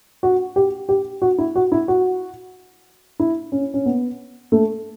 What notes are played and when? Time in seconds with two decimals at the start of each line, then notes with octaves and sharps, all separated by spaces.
0.23 F#4
0.56 G4
0.89 G4
1.22 F#4
1.38 E4
1.55 F#4
1.72 E4
1.88 F#4
3.20 E4
3.52 C#4
3.74 C#4
3.86 B3
4.52 A3